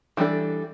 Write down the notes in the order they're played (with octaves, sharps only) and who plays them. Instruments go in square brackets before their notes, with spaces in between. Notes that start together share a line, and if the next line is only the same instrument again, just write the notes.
[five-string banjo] E3 G3 D4 A4